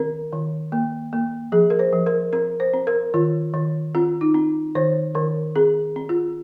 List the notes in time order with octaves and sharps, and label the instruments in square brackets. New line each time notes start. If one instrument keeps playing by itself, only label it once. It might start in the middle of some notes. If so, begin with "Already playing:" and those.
Already playing: [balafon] D#3 C4 A#4
D#3
A#3
A#3
F3 G#4
A#4
C5
F3
A#4
C4 A#4
C5
C4
A#4
D#3 F4
D#3
C4 F4
D#4
C4
D#3 C5
D#3 A#4
C4 G#4
C4
F4